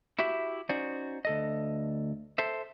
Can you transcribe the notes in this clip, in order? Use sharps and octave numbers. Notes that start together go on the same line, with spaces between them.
E4 F#4 G4 E5
C#4 D#4 F#4 C5 D5
D2 A4 D#5
A4 C5 E5